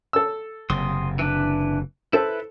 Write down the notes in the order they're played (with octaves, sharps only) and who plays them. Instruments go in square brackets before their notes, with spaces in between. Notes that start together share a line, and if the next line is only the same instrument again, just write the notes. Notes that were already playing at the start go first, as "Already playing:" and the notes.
[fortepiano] A4 E6
[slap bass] F#1 C3 [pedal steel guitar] C6 D#6
[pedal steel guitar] E3 D4 B4
[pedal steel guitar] E4 B4 [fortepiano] A4 C5